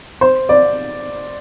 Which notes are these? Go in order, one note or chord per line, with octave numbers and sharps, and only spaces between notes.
C5
D5